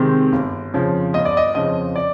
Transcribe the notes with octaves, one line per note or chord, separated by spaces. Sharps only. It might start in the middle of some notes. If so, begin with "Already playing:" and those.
Already playing: C3 D#3 G#3 C4
G1
F2 C#3 F3
G1 D#5
D5
D#5
F2 C#3 F3 D#5
D5